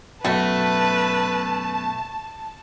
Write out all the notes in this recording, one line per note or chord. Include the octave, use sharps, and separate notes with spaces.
F#2 B2 A3 F#4 B4 A5